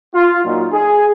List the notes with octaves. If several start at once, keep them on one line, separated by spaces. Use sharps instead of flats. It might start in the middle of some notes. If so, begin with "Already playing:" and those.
F4
A#2 F#3 D#4
G#4